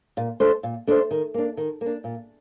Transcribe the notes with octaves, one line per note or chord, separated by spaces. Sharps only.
A#2
A3 D4 A4 C5
A#2
A3 D4 A4 C5
D#3
A#3 D4
D#3
A#3
D4
A#2